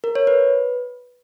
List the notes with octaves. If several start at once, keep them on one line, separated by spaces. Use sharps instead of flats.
A#4
C#5
B4